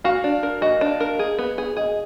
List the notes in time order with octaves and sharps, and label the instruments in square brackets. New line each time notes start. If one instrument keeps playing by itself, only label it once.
[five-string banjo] F#4 [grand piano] F5
[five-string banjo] D4
A#4
[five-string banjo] F#4 [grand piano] D#5
[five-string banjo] D4
A#4
G#4
B3
G#4
[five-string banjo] G#4 [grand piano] D#5